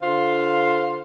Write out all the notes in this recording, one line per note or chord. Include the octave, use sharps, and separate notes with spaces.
D3 F4 C5 F5